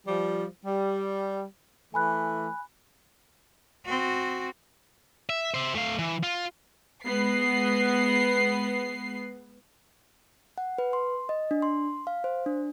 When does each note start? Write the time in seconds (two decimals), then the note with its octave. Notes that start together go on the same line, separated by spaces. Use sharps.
0.07 F3 G3
0.66 G3
1.94 E3 A3 G#5 B5 F#6
3.85 C4 F#4
5.29 E5
5.54 C5 E5
5.75 A3 F5
5.99 E3
6.23 F4
7.05 G#3 B3 C7
10.58 F#5
10.78 B4
10.93 C6
11.29 D#5
11.51 D4
11.62 C6
12.07 F5
12.24 C5
12.46 D4